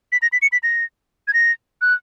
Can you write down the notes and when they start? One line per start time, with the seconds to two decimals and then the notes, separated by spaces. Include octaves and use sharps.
0.12 B6
0.22 A#6
0.32 B6
0.42 C#7
0.52 B6
0.63 A#6
1.28 G#6
1.33 A#6
1.81 F#6